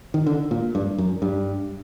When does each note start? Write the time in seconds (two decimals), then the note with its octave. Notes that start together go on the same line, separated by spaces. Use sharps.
0.14 D#3
0.26 D3
0.51 A#2
0.75 G2
0.98 F#2
1.22 G2